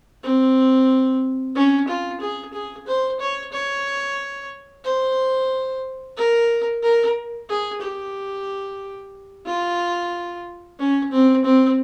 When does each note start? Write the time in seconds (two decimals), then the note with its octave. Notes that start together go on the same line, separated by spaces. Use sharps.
0.23 C4
1.55 C#4
1.88 F4
2.21 G#4
2.53 G#4
2.87 C5
3.20 C#5
3.53 C#5
4.84 C5
6.17 A#4
6.83 A#4
7.49 G#4
7.81 G4
9.46 F4
10.79 C#4
11.12 C4
11.45 C4